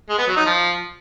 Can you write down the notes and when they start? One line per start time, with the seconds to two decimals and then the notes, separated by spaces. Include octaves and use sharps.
0.09 G#3
0.18 B3
0.27 F#3
0.36 D#4
0.46 F3